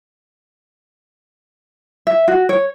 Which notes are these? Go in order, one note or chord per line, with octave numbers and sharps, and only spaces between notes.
E5
F#4
C#5